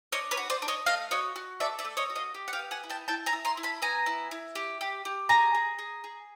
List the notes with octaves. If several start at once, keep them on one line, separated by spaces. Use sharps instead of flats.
D4 C#5 D#5
B4 C#5
F#4
C5 D5
D4
C#5 D#5
A3 D#5 F5
F#4 C#5 D#5
F#4
A4 D5 E5
D5 E5
A3
C#5 D#5
F#4
D#5 F5
G4
F#5
F5 G5
B3
F#5 G#5
E4
G5 A5
E4 G5 A5
G#5 A#5
E4
A#5 C6
E4
A5 B5
B3 G#5 A#5
E4
E4
G4
G4
G4
G#4 G#5 A#5
G#4
G#4
G#4